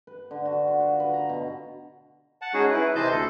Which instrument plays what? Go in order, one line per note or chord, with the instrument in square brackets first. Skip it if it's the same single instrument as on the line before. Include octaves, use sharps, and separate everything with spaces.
[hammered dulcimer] B4
D3
F#4
F4
F#4
B4
A#5
B2
[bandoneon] F#5 A5
G#3 C#4 D#4 F#4 G#4
E4 B4
C3 E3 C5 D#5 A5 G6
D2 A4